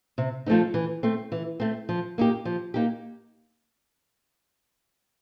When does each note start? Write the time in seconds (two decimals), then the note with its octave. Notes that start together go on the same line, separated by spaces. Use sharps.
0.18 C3
0.46 F3 A3 C4 D#4
0.74 E3
1.03 A3 C4
1.32 E3
1.60 A3 C4
1.89 F3
2.18 A#3 D#4 G4
2.45 F3
2.74 A#3 D#4 G4